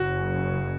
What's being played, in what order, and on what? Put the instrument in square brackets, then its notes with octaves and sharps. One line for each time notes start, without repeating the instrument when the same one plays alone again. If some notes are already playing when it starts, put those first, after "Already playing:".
Already playing: [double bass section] F#1 F#2 C#3 [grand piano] F#4